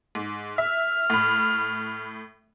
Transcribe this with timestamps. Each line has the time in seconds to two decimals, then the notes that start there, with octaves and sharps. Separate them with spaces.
0.15 G#2
0.58 E5 F6
1.10 A2 B5